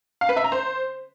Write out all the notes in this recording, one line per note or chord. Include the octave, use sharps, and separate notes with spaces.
F5
B4
E5
A#5
C5